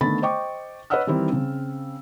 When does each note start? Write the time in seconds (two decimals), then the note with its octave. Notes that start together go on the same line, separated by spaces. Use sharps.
0.01 D3 D#3 A3 B3 B5 A6
0.22 C5 D#5 G5 C#6 D6
0.90 B4 C#5 D#5 F#5 E6 F6
1.07 D#3 E3 G3 C4 D#4 E4
1.32 C#3 C4